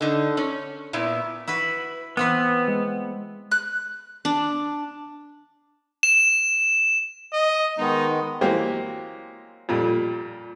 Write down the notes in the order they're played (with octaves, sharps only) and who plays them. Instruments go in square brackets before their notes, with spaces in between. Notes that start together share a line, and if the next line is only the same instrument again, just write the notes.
[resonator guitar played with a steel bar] D3 D#4
C#4
A#2 B3 E4
[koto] E4 F#4 B4
[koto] E3 C4 B4 [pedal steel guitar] B3
[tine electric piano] G#3
[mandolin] F#6
[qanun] D4
[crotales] E7
[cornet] D#5
[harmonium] D#3 G#3 B3 [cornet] D#4
[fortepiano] E3 F#3 G#3 A#3 C4 G4
F2 A#2 G3